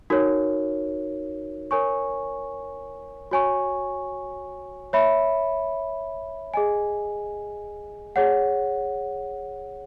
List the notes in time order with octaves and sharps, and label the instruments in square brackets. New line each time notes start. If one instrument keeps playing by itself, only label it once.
[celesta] D#4 F#4 A#4 C#5
A#4 C#5 G#5 C#6
F#4 C#5 G#5 C#6
C#5 E5 B5
G#4 D#5 G#5
G#4 C#5 F#5